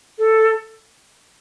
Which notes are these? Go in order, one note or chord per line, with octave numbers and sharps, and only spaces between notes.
A4